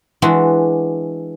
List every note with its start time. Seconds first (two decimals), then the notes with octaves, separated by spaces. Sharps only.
0.22 E3 G#3 D4 F#4